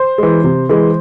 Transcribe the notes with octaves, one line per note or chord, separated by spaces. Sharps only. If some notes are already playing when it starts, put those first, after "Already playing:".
Already playing: C5
E3 G#3
C3
E3 G#3